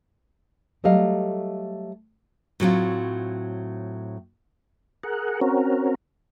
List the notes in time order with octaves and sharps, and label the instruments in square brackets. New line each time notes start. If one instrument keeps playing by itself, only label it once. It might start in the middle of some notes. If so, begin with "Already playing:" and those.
[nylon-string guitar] F#3 G3 A3 D#5 F5
A2 F#3 C4 F4
[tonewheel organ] G#4 A#4 F#5
C4 C#4 F#4 A#4